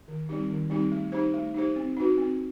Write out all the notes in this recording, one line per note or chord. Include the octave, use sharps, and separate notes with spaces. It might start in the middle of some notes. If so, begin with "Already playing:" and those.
D#3
G3 C4 D#4 G4
D#3
G3 C4 D#4 G4
A3
D#4 G4 C5
A3
D#4 G4 C5
C4
D#4 F#4 B4
C4